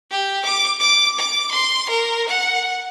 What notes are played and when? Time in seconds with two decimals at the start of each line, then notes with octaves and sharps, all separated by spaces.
0.11 G4
0.45 D6
0.80 D6
1.18 D6
1.52 C6
1.89 A#4
2.28 F#5